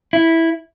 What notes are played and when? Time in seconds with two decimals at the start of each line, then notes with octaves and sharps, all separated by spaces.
0.13 E4